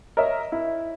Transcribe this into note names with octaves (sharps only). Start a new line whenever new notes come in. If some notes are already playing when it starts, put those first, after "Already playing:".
A#4 C#5 D#5 E5
E4